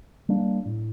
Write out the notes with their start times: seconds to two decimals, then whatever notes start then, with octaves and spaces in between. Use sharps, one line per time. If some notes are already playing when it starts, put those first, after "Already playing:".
0.29 G3 A#3 D4
0.65 A2